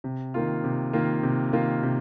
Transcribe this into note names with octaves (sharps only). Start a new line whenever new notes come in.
C3
D#3 A#3 F4
C3
D#3 A#3 F4
C3
D#3 A#3 F4
C3